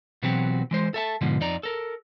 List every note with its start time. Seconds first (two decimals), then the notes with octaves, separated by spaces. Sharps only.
0.22 B2 E3 F#3 C4 F#4 G4
0.71 E3 G#3 C5
0.94 A4 E5 A5
1.21 G#2 B2 D3 F3 D#4
1.40 F2 D#4 D5 A#5
1.63 A4 A#4